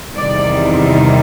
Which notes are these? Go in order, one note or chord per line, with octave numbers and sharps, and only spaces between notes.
E2 C3 D#3 G3 D5